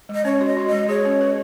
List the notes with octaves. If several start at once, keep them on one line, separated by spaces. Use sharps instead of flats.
G#3
D#5
C#4 C#5
F#4 D#5
F#4
G#3 D#5
G#4 C#5
C#4
B4